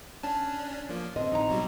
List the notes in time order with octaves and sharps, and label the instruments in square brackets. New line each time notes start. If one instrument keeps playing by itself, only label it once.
[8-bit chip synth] C#4 D4 [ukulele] A5
[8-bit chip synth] F3 A#3
[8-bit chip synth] D3 [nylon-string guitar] C4 D#5
[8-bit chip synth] A1 [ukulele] D#4 A#5
[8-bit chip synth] B2 F#3 G3